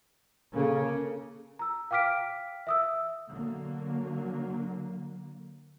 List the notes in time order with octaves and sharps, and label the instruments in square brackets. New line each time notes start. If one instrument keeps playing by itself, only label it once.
[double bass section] C#3 [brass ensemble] A#3 A4
[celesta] A#5 E6
F5 G5 D6 F6 B6 D7
E5 D#6 E6
[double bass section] D3 F#3 A#3